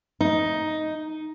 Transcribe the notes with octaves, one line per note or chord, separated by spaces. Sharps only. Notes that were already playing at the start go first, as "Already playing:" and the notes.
D#4